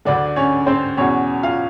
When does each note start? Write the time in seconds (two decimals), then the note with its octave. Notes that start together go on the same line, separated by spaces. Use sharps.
0.05 D2 D3 D4 D5
0.36 C#4 C#5
0.66 C4 C5
0.97 E2 B2 C#4 C#5
1.43 F4 F5